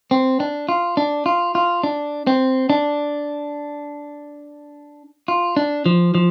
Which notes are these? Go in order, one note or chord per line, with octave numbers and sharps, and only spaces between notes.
C4
D4
F4
D4
F4
F4
D4
C4
D4
F4
D4
F3
F3